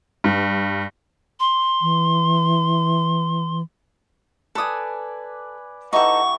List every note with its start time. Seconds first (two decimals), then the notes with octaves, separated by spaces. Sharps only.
0.24 G2
1.40 C6
1.81 E3
4.55 A4 B4 D5 G#5 D#6
5.93 E3 D#4 G4 A4 F#5 C#6